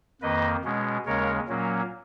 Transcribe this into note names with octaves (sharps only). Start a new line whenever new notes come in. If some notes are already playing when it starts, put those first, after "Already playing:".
F2 D#3 A#3 B4 D#5
B2 G#3 C#4
D#2 C#3 G#3 C#4 A#4 C#5
A#2 F#3 A#3 C#4